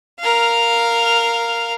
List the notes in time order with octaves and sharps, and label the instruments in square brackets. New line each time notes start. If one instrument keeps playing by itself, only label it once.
[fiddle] A#4 F5